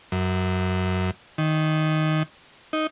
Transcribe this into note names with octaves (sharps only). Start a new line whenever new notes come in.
F#2
D#3
D#4